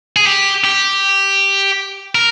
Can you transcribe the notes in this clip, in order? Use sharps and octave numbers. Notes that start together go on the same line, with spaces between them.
G#4
G4
G4
A#4